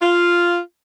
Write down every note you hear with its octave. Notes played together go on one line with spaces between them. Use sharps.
F4